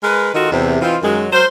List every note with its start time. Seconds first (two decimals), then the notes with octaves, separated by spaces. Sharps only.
0.04 G#3 A#4 B4
0.34 D#3 F4 F#4 A4 D#5
0.51 E2 C3
0.82 E3 C4 D#4 F4
1.02 F#2 D#3 F#3 G#3
1.32 F#3 A#4 C5